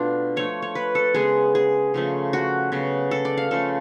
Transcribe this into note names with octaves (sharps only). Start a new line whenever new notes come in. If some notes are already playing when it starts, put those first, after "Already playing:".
Already playing: B2 A3 D4 F4
F3 A3 C#5
C#5
B4
A4
C#3 G#3 B3 G#4
G#4
C#3 F3 A3
F#4
C#3 F#3 B3
A4
D5
F5
C#3 F3 A3 A4